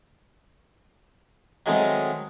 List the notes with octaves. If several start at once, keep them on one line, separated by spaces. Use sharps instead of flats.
D#3 F#3 G#3 A3 C4 D#4